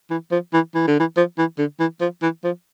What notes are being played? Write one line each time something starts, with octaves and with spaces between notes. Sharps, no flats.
E3
F3
E3
E3
D3
E3
F3
E3
D3
E3
F3
E3
F3